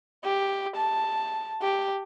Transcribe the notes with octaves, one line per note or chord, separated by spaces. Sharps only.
G4
A5
G4